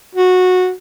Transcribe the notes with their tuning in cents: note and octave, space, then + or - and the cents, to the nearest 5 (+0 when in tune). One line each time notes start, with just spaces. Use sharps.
F#4 -15